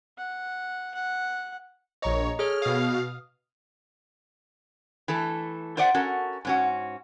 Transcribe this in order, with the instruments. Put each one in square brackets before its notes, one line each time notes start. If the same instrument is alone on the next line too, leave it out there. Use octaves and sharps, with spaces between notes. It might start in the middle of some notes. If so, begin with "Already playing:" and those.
[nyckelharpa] F#5
F#5
[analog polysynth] A#1 C#5 [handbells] D#5 A#5
[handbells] G#4 A4 C#5 [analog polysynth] F6
[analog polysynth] B2 F5 [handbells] D#6 F6
[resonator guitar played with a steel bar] E3 A3 A4
F4 C5 D5 E5 F#5
C#4 F#4 A4 A#4
G#2 C#4 F#4